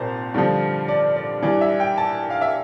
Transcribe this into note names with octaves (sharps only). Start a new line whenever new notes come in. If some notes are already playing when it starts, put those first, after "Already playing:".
Already playing: C2 A#2 C5 A5
G2 D3 F3
D5
D5
G2 E3 D5
E5
G5
A5
F5
E5